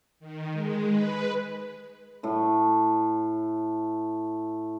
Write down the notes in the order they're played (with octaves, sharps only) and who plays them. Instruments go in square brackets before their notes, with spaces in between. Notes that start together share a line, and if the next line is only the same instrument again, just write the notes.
[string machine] D#3
G#3
B4
[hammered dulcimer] A2 A3